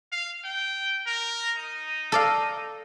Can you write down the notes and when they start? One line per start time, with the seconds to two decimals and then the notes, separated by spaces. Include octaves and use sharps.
0.12 F5
0.45 G5
1.06 A#4
1.57 D#4
2.12 A4 D5 F5